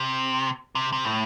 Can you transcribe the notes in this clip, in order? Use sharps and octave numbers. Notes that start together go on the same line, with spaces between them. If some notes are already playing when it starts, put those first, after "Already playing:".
Already playing: C3
C3
C3
A2